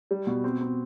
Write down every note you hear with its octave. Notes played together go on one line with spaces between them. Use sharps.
G3
B2
C4
C4